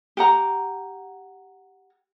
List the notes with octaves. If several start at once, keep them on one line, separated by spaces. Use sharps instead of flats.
G4 F#5 A#5